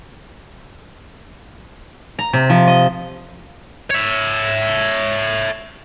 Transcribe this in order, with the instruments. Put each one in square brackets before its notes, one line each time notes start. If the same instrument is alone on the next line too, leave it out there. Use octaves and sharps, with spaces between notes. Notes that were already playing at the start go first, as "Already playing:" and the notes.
[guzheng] A#5
C3
F3
D#5
[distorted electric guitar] C#5 E5